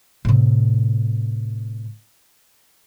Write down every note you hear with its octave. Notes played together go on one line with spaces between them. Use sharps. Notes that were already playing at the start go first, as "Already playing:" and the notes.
A2 C3